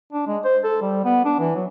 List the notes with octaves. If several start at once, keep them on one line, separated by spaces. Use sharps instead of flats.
D4
G#3
C5
A4
G3
B3
D4
E3
F#3